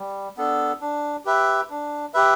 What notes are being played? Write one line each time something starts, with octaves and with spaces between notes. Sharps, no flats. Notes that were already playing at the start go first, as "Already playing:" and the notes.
Already playing: G3
B3 D4 A4
D4
G4 B4 E5
D4
G4 B4 E5